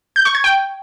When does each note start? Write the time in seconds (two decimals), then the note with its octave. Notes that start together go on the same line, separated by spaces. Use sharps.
0.16 G6
0.25 C#6
0.35 G#6
0.44 G5